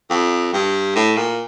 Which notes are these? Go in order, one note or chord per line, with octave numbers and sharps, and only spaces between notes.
F2
G2
A2
A#2